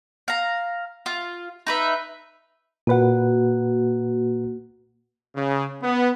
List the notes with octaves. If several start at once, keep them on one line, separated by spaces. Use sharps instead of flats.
F5 A#5
F4
D#4 B4 E5
A#2 A#3 F#4 B4 F#5
C#3
B3